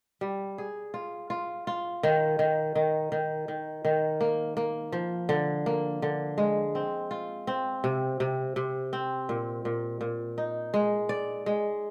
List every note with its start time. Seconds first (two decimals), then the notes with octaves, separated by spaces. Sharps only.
0.21 G3
0.58 G#4
0.94 F4
1.30 F4
1.67 F4
2.03 D#3
2.39 D#3
2.75 D#3
3.12 D#3
3.48 D#3
3.85 D#3
4.21 A#3
4.57 A#3
4.92 F3
5.29 D3
5.66 A#3
6.02 D3
6.38 G#3
6.75 C4
7.11 F4
7.47 C4
7.84 C3
8.20 C3
8.56 C3
8.93 C4
9.29 A#2
9.65 A#2
10.01 A#2
10.38 D#4
10.74 G#3
11.09 D5
11.46 G#3